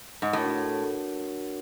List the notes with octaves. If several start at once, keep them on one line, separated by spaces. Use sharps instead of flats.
G#2
A2 D4 F#4 A#4 C#5 F#5